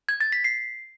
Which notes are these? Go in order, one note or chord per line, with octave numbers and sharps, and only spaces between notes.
G#6
A6
B6
C7